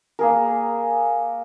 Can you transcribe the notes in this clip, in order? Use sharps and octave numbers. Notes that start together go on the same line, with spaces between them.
A#3 G#4 A#4